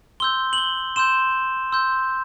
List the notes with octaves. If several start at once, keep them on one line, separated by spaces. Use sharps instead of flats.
C6 E6 G6 G7
F#7
G7
C6 E6 G6 E7
C6 E6 G6